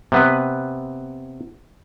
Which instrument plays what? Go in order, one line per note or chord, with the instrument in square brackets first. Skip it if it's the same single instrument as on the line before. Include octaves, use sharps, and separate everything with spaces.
[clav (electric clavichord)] C3 B3 B4